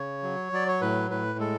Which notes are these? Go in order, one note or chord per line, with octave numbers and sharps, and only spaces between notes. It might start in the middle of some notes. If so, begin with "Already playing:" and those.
Already playing: C#3 C#5
F#3
F#3 D5
C#5
A2 B4
A2 B4
G#3 A4